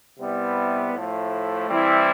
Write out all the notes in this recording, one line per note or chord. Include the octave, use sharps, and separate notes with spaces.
C3 G3 B3 E4
A2 F3 A3
E3 G3 C4 E4